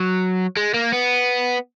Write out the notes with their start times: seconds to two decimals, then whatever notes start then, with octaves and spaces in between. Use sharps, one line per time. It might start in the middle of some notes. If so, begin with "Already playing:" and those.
Already playing: F#3
0.57 G#3
0.74 A#3
0.93 B3